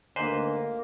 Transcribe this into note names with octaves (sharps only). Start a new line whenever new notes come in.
D2 G#2 A#3 B4 C5